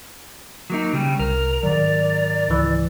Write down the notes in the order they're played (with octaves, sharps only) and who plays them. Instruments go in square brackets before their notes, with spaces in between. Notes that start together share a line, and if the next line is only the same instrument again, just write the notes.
[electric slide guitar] F#3 A#3 D#4
C#3 G3
[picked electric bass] C2 [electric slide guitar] A#4
[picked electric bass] G#2 D#3 F#3 [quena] D5
[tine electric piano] C#2 E3